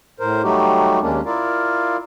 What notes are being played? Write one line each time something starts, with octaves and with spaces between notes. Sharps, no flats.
A2 A#4 C5
F#3 G3 A3 D#4 F#4 G4
D#2 G#3 A#3 C#4 D4
E4 F4 A#4 D5 F5